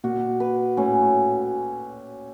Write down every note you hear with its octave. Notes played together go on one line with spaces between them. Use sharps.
A#2 F#4
B4
A2 C#4
A2